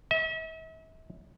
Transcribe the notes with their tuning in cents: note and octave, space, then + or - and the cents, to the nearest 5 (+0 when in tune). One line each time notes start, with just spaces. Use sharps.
E5 -45